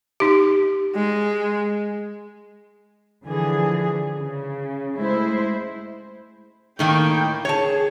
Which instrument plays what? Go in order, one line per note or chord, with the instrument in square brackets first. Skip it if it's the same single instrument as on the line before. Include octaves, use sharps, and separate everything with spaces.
[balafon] D#4 G4
[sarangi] G#3
[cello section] D3 E3 F3 G#4
C#3
G#3 A3 E4 C5
[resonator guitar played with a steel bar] A2 D#3 A#3 [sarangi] G5
[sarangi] G#4 [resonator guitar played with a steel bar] C#5 A5